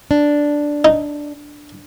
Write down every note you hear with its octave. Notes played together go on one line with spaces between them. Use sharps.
D4
D#4